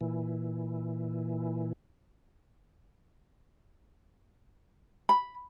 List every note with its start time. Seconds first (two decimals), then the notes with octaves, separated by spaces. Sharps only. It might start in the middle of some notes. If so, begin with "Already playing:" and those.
0.01 A#2 E3
5.09 B5